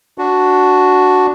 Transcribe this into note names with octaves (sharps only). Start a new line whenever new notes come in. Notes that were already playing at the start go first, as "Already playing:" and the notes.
D4 F#4